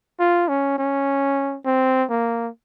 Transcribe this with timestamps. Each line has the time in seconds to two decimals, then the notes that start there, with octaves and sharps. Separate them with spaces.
0.20 F4
0.49 C#4
0.79 C#4
1.66 C4
2.10 A#3